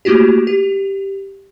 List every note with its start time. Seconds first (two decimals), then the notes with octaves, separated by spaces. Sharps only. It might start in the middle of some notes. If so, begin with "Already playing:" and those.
0.05 A3 A#3 E4 F#4 G4
0.47 G4